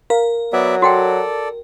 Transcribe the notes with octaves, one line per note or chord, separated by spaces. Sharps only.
A#4 F5
F#3 B3 D5 E5
F#4 A4 D5 F#5 G5